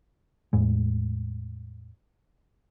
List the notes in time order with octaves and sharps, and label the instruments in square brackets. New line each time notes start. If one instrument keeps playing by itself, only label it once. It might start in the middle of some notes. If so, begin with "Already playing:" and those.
[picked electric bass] E2 A2 G#3